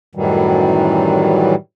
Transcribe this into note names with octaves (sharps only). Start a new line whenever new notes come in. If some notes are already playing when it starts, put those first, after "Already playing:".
F#2 A2 D#3 E3 F#3 G3